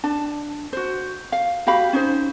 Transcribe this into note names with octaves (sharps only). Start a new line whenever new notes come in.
D4 A5
F#4 C5
F5
F#4 G4 F5 B5
C#4 D#4 C5